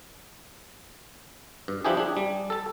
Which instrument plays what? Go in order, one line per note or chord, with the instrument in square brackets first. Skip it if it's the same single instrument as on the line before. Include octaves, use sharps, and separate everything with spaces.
[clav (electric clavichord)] G2
F3 D4 E4 G4 G#4
D4 G#4
G3
A4 A5